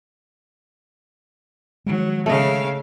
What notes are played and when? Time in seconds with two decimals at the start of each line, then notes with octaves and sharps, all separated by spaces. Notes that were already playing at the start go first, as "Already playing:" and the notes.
1.86 D#3 F3 F#3 G#3
2.26 C#3 A3 D#5 F5